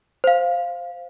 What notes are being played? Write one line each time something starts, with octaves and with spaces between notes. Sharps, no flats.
C5 F5